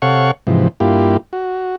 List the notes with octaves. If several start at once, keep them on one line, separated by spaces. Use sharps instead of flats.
C3 A4 C#5 F5 F#5 C#6
G#2 C3 E3 F3
G2 A#3 E4 F4 G4
F#4